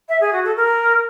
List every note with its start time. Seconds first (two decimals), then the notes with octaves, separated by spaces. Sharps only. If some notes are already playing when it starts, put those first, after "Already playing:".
0.09 E5
0.21 G#4
0.33 F#4
0.45 A4
0.57 A#4